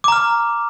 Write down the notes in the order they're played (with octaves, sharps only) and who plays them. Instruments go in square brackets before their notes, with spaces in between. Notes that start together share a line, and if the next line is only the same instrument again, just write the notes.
[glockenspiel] D6
A#5
F6